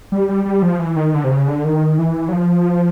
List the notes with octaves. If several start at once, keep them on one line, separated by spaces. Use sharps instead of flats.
G3
G3
G3
F3
E3
D#3
D3
C3
C#3
D3
D#3
E3
F#3
F3